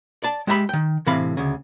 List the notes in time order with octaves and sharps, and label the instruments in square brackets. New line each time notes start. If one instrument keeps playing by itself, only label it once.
[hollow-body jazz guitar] D5 A5
G#3 G4 E5 A#5 B5
D#3 G5
A2 C3 E3 C4 F5 B5
D2 C#3